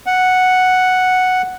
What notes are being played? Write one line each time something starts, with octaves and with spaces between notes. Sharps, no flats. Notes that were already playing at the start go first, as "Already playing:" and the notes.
F#5